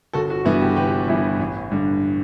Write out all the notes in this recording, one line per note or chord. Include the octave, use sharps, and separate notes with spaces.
G1 F#4 A4
F#4
G2 E3 B3 E4 F#4
G4
G1 G4 B4
G2 E3 B3 E4
A1
G2 D3